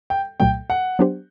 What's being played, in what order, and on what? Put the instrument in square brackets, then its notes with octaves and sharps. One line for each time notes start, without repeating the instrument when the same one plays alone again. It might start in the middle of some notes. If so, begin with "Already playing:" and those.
[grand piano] G5
[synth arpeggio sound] C2 A#2 F#3 A3 [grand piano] G5
[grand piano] F#5
[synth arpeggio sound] F#3 B3 D4 G4 C5